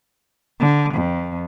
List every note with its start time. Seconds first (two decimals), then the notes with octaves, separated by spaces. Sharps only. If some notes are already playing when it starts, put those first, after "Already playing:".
0.60 D3
0.94 F2